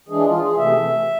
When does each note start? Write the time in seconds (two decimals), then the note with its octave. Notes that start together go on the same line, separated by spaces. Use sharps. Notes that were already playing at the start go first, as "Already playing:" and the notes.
0.08 E3 G#3 D4 G#4
0.25 F4
0.41 G#4
0.56 C3 E3 A3 E5